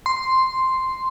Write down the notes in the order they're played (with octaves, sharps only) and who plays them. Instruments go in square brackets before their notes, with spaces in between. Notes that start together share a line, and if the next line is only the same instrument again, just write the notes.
[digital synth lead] C6